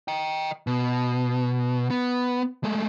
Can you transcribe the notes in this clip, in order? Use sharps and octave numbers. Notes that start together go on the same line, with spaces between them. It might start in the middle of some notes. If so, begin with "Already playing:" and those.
D#5 G5
B2
B3
G#3 A3